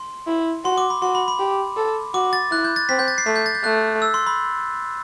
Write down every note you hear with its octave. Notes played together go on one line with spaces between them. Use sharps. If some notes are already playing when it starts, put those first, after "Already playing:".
Already playing: C6
E4
F#4 C6
D6
B5
F#4 C6
B5
B5
G4
A4
F#4 D6
A6
E4 F#6
G6
A6
C4 B6
G6
A6
C7
A3 B6
G6
A6
G6
A3 F#6
E6
C6
B5